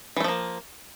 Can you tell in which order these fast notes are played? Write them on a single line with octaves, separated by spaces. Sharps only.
E3 A3 F3 A#3